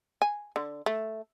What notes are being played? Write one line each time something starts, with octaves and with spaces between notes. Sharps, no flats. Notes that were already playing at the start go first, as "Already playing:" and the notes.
G#5
D3
A3